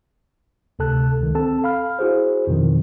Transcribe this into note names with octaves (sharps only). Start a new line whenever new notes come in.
D2 C3 A4 A5 F#6
C#2 D#3
C4 A4 A5
F5 B5 F6
E4 F#4 G#4 C5
F2 B2 D#3 F3